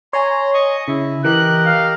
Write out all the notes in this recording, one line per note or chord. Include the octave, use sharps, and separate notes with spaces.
C#5 G#5 A#5 C6
D#5 C#6 D#6
C#3 E4
E3 G4 A#4 D#5 F#6
F5